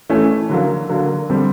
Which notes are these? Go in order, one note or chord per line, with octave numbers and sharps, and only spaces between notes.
E3 A3 C#4
D3 F#3 A#3
D3 F#3 A#3
D3 G3 C4